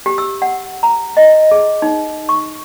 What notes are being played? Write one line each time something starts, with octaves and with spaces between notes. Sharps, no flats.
G4
E6
F#5
A#5
D#5
G#4
D#4
C#6